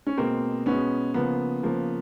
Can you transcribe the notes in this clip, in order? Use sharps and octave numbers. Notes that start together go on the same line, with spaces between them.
C#4
B2 G#3 A#3 C4
B2 G#3 B3 C#4
C#3 F3 A#3 B3
C#3 F3 A#3